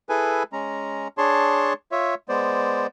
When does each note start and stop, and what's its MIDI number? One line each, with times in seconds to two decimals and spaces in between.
0.09 0.43 64
0.09 0.43 68
0.09 0.43 69
0.09 0.43 71
0.09 0.43 80
0.53 1.08 56
0.53 1.08 61
0.53 1.08 82
1.18 1.73 62
1.18 1.73 68
1.18 1.73 73
1.18 1.73 81
1.18 1.73 84
1.92 2.15 65
1.92 2.15 73
1.92 2.15 76
2.29 2.87 56
2.29 2.87 59
2.29 2.87 72
2.29 2.87 74